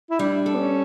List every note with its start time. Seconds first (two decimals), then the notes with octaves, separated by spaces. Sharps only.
0.10 E4
0.19 G3 D4
0.46 A4
0.55 B3
0.59 C#4